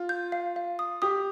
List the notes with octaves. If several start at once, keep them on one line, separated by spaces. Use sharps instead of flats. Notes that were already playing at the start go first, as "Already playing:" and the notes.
Already playing: F4
G6
F5
F5
D#6
G4 D#6